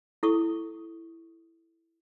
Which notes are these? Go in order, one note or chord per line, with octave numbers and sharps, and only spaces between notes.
E4 A4 C#6 D#6